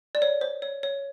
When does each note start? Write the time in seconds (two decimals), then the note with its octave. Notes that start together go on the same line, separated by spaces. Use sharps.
0.15 D5
0.22 C#5
0.41 C5
0.62 C#5
0.83 C#5